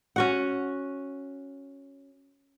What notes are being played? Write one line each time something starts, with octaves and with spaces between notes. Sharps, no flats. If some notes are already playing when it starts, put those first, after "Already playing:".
C#4 F#4 F#5